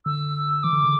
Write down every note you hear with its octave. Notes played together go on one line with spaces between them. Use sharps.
D3 E6
E3 D6
D3
C#3